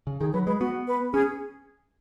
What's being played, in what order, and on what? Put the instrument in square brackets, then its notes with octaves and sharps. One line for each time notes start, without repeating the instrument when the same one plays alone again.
[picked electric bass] C#3
[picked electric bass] D#3 [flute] G#4
[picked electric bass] F#3 [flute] B4
[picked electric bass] G#3 [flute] B4
[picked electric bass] B3 [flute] F#4
[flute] B4
[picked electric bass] C#4 [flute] G#4